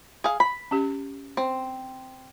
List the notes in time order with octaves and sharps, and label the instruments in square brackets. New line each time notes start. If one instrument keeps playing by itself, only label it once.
[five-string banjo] G#4 F5
B5
[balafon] C#4 G4
[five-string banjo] C4